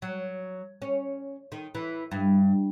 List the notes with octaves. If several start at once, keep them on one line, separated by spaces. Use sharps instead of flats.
F#3
C#4
D#3
E3
G2